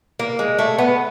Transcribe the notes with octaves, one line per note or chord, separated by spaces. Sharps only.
A#3
G#3
A3
B3